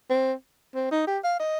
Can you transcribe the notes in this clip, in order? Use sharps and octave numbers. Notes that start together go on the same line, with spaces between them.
C4
C4
D#4
G4
F5
D#5